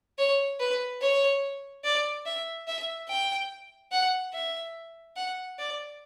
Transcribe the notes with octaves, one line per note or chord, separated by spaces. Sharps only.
C#5
B4
C#5
D5
E5
E5
G5
F#5
E5
F#5
D5